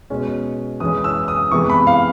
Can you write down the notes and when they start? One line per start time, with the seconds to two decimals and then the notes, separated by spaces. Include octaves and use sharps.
0.10 B2 G#3 C#4
0.80 E3 G#3 C#4 D#6
1.04 E6
1.28 D#6
1.51 C3 E3 G#3 B3 C#6
1.70 B5
1.87 F5